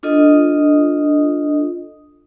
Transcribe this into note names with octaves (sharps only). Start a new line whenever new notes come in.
D4 F4 A4 D#5 D#6